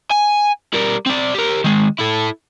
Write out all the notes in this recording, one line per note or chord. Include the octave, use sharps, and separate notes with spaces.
G#5
G3 A#4
C4 D5
G4 A#4
D#3 G#3
E4 A4